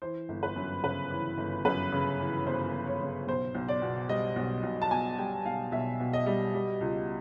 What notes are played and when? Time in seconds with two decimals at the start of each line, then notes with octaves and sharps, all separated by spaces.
0.02 E3 C5
0.29 G1
0.43 B4
0.56 F#2
0.84 C#3 B4
1.11 E3
1.38 G1
1.65 F#2 B4
1.92 C#3
2.20 E3
2.46 G1 C5
2.74 F#2
2.87 C#5
3.01 C#3
3.27 B1 C5
3.55 B1
3.69 D5
3.82 B2
4.09 G3 D#5
4.36 B1
4.63 B1
4.82 A5
4.91 B2 G#5
5.18 G3 G5
5.45 B1 F5
5.72 B1 E5
6.00 B2
6.13 D#5
6.26 G3
6.54 G3
6.81 C#2